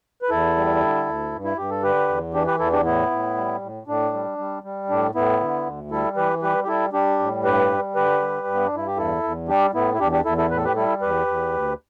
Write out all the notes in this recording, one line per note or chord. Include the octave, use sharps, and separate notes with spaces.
B4
E2 E4 A4
G3
D3
D2
G2
E4
G2 G4
A4
D3 G4 B4
E2
E3 D4 G4
G4 B4
E2 E4 A4
D4 G4
A2 B3 E4
A2
G3
A2
A2 D4
G3
G3
G3
A2 D4
A2 B3 E4
D3
D2
G3 E4 A4
E3 G4 B4
G3 G4 B4
G4
G3 E4 A4
G3 D4 G4
A2
G2 G4 B4
G3
D3 G4 B4
G3
G2
B3
D4
G2 E4
G4
E2 E4 A4
E2
G3 D4 G4
A2 B3 E4
E4
E2 D4 G4
D4 G4
E2 E4 A4
E4 A4
A2 B4
A4
G4 B4
G3 E4 A4
E2 G4 B4
E2
D2